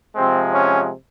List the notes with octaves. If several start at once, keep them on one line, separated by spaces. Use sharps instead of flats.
C3 F3 G#3 C4
C#4